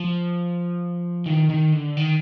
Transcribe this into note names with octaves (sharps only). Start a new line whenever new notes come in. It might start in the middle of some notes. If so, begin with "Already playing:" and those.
Already playing: F3
D#3
D#3
D3
D#3